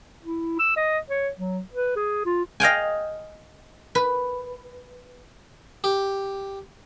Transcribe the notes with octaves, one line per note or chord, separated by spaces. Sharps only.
E4
E6
D#5
C#5
F#3
B4
G#4
F4
D#5 F5 G5 G#5
B4
G4